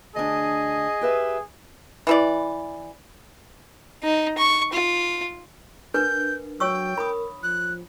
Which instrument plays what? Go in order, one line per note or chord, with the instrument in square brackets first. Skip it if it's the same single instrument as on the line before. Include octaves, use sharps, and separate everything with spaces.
[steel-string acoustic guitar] D2 D4 [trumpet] G#4 [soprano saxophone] D#5
[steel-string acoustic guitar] G4 B4 E5
[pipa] E3 E4 D5
[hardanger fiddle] D#4
C#6
F4
[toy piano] D4 A#4 B4 [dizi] G6
[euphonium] F#3 [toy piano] C#5 C#6 E6 [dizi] G5
[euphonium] A#4 [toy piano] B5 D#6
[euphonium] F3 [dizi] F#6